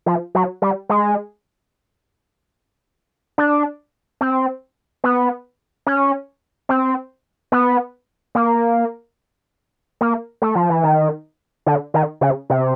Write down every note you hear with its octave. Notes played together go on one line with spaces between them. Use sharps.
F3
F#3
G3
G#3
D4
C4
B3
C#4
C4
B3
A#3
A#3
A3
F3
E3
D#3
D3
D#3
C#3
C3